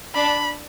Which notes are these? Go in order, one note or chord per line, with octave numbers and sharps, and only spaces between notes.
D4 B5